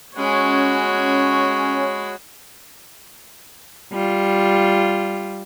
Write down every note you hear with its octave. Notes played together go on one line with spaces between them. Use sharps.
G#3 C#4 F#4 C#5 B5
G3 F4